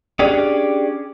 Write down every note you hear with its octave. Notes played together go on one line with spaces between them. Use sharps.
C#4 D4 G4 G#4 D5